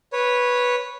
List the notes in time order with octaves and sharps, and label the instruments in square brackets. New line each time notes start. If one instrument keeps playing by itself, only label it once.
[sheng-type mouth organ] B4 C#5